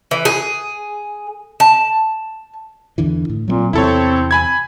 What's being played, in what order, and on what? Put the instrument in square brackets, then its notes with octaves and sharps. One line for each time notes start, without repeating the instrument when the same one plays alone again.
[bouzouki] E3
G#4
A5
[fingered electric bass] E2 D3 E3
A2
[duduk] A#2 [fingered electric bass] F#3 G#3 C4
[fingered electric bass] E2 C3 [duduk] C4 [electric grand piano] E4 A4 C#5
[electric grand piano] G#5 B5 G#6